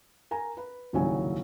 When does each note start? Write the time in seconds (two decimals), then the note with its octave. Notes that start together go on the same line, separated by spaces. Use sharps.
0.31 A#4 G#5 A#5
0.57 B4
0.93 D#1 C2 G#2 C#3 F#3 G#5